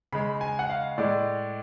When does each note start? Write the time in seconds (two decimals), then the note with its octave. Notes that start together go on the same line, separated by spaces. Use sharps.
0.13 C#3 G#3 B5
0.41 G#5
0.59 F#5
0.70 F5
0.98 A2 G#3 D5